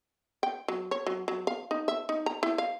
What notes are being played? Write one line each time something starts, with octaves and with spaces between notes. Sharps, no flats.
G5
F#3
C#5
F#3
F#3
F5
D#4
E5
D#4
A#5
E4
F5